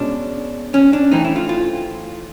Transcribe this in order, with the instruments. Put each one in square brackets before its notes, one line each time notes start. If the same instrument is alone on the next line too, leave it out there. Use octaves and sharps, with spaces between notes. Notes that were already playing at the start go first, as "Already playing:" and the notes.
Already playing: [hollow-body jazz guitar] B2 G#3 C#4 D4
C#4
D4
E3 A3 C4 D#4
E4
F4
F4